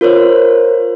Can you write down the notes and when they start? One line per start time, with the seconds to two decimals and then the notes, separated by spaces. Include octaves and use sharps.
0.01 F4 A#4 C5 C#5